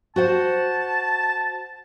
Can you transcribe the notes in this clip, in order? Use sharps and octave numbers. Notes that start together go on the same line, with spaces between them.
F#4 C5 F#5 A5